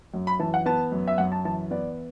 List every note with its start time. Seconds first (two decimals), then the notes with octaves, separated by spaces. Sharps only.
0.14 F#2
0.27 B5
0.39 E3 A5
0.54 F#5
0.66 B3 A5
0.92 F#2
1.08 E5
1.18 F#2 F#5
1.32 A5
1.45 E3 A5
1.71 B3 D5